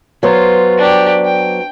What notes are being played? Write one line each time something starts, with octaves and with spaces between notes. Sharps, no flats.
F#3 B3 F4 C5
D4 G4
G5